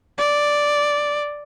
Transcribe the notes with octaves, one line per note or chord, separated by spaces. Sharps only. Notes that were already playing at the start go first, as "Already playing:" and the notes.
D5